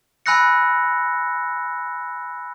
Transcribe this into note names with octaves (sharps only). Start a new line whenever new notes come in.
G#5 B5 E6 F#6 A#6 C#7